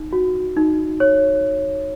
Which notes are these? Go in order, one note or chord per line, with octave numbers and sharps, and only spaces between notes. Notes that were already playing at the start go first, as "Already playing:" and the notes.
Already playing: D#4
F#4
D#4
C#5